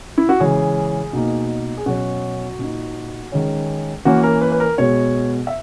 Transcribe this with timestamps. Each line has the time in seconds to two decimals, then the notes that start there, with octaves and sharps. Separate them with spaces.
0.18 E4
0.29 F#4
0.40 C#3 E3 G#3 C#4 G#4
1.13 B2 A#3 D#4
1.77 G#4
1.86 B2 F#3 C#4 F#4
2.59 A#2 A#3 D#4
3.32 D#3 G#3 C#4
4.05 E3 A#3 C#4 F#4
4.23 A#4
4.42 B4
4.52 B4
4.60 A#4
4.78 B2 G#3 B3 C#5
5.47 E5